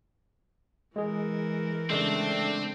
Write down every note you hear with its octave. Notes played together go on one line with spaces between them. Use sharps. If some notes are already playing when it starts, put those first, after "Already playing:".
E3 G#3 G#4 A#4
C#3 G#3 A3 C4 D4